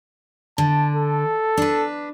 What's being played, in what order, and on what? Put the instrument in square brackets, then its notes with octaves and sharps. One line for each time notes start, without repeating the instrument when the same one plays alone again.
[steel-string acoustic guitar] D3 [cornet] A5
[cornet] A4
[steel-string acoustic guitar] D4 B4